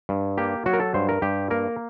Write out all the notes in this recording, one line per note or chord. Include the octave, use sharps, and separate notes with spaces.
G2
A#3 G4
F#3 F#4
A#4
A4
G2 C5
A#4
G2 G4
A#3 A#4